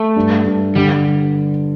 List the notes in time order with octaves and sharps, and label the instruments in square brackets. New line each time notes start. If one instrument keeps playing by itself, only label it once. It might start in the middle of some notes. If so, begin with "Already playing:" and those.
Already playing: [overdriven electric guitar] A3 [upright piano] A4
[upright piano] G2
G2
[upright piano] D3 [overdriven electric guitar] G3